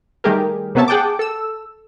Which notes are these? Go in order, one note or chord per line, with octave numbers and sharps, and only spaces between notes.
D#3 G3 A3 G4 G#4 A#4
C3 A#3 B3 C#4 E5 A5
G#4 F#5 G5 A5 D6
A4 E6